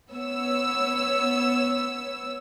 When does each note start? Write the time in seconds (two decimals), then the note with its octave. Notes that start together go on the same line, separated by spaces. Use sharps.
0.11 B3 C#5 E6